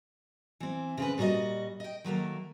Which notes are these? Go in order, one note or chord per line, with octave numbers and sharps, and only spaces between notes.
E3 C4
C#3 C4 B4
A#2 G3 F#4 G#4 D#5
D#5 G5
D#3 F#3 A3 A#3